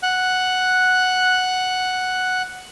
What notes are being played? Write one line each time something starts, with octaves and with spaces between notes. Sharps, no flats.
F#5 F#6